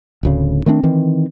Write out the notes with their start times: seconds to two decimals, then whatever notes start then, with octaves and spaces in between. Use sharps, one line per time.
0.23 D1 D2 C#3
0.66 D#3 A3 C4 D4
0.83 D#3 E3 C4